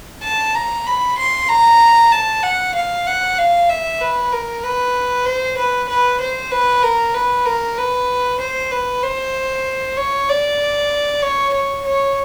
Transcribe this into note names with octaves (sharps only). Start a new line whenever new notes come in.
A5
A#5
B5
C6
A#5
A5
F#5
F5
F#5
F5
E5
B4
A#4
B4
C5
B4
B4
C5
B4
A#4
B4
A#4
B4
C5
B4
C5
C#5
D5
C#5
C#5
C#5